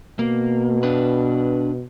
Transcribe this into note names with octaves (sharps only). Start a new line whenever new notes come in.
B2 A#3
D4 B4